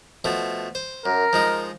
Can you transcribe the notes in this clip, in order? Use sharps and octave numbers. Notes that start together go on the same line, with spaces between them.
B2 F3 A3
C5
F#2 A#4
F3 G#3 D#4